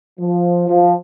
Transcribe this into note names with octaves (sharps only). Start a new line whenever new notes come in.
F3
F3